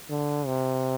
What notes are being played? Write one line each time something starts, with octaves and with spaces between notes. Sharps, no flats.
D3
C3